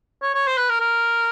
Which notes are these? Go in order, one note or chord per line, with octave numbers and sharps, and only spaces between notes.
C#5
C#5
C5
B4
A#4
A#4